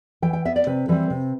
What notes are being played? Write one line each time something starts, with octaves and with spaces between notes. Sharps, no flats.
E3 G5
G5
B3 E5
D5
C3 B4
E3 G3 C4 B4
C3